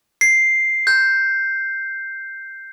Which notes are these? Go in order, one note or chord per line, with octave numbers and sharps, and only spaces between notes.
C7
G6